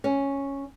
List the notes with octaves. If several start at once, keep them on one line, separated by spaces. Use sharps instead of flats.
C#4